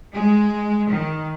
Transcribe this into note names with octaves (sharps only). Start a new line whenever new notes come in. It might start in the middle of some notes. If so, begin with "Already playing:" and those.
G#3
D#3